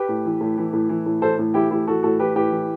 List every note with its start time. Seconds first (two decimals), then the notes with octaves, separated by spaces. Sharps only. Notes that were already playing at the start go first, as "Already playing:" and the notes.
Already playing: G4 B4
0.09 A2
0.25 E3
0.41 A2
0.58 E3
0.73 A2
0.89 E3
1.06 A2
1.22 E3 A4 C5
1.39 A2
1.54 E3 E4 G4
1.71 A2 E4 G4
1.87 E3 F#4 A4
2.03 A2 F#4 A4
2.19 E3 G4 B4
2.36 A2 G4 B4
2.51 E3